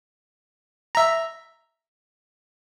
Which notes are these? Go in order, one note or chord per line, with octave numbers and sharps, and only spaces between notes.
E5 A#5